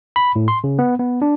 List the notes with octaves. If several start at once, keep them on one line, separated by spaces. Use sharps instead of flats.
B5
A2
C6
C#3
B3
B3
D4